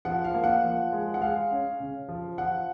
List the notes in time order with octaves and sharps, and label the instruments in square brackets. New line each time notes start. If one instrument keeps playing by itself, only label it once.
[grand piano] F3 F#5
F5
A#3
F#5
F3
G#3
F#5
G#3 F5
C#4
C#3
F3
F3 F#5